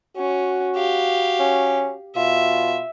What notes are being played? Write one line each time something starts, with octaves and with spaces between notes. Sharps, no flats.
C#4 F#4
G4 F5
C#4
B2 F4 E5